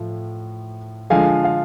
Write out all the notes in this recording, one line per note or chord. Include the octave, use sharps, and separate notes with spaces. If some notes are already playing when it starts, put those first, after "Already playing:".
Already playing: A2 F3
D3 F3 G#3 F5 G#5
F5